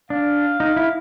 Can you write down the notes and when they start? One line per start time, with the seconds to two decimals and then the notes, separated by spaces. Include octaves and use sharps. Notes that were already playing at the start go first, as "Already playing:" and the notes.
0.10 D4 F5
0.60 D#4
0.77 E4